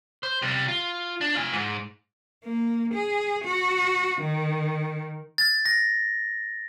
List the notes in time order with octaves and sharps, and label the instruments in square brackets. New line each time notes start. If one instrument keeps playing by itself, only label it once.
[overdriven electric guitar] C5
C3 G3
F4
D4
F4 G#5
G#2
[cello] A#3
G#4
F#4
D#3
[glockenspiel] A6
A#6